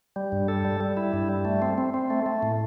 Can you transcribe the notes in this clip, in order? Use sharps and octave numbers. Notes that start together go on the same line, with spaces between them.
G3
G2
A4
G3
G3
E4
G2
G3
A3
C4
C4
C4
A3
A3
A2